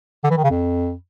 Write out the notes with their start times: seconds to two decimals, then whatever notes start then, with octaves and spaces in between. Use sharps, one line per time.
0.24 D3
0.31 E3
0.37 D#3
0.44 C#3
0.50 F2